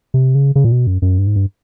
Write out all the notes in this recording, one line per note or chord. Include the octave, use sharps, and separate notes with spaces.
C3
C#3
C#3
A#2
B2
F#2
F#2
G2
G#2
G2